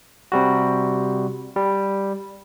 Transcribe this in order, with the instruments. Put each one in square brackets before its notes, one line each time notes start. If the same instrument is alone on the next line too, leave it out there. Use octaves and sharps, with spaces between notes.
[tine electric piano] C3 G3 F#4
G3